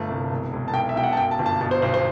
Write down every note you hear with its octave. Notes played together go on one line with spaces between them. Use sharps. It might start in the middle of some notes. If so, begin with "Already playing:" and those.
Already playing: G1 A3 A5
C2
E1
E1
A5
B1 G5
E5
B1 G5
F#5
A5
F#2 G5
A5
G1
A5
B2 A5
C5
B1 C5
C5